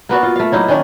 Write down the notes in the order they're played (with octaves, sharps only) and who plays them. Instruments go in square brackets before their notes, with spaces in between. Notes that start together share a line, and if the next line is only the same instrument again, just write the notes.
[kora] A#3 B3 F#4 D5
F4
A3 F5
F#3 A#3 D#4 E4
D#3 C#4 D4